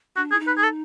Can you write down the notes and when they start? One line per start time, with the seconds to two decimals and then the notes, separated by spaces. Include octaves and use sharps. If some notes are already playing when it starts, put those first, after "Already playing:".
0.16 D4 F#4
0.31 G#4
0.34 E4
0.40 D#4
0.47 B4
0.57 G#4
0.63 A4